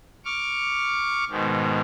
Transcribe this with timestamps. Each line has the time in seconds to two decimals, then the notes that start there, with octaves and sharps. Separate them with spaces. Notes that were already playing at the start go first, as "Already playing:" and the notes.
0.25 C#6 D6 F6
1.30 G#2 B2 D#3